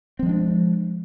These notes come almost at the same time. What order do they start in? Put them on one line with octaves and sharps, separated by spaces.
C4 F3 G#3 D4